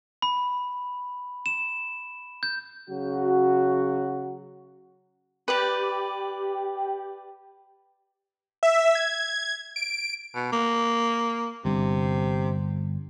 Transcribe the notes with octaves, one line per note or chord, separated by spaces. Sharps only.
B5
E7
G6
C#3 F#3 F#4
G4 B4 D5
E5
G#6
D7
B2
A#3
G1 G2 C3